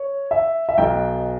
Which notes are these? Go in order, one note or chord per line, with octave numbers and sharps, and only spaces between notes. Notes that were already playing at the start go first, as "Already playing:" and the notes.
Already playing: C#5
E5
E5
B1 B2 G5